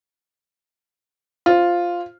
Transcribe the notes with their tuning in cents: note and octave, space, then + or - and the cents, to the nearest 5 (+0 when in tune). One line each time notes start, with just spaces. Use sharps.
F4 +0 C5 +0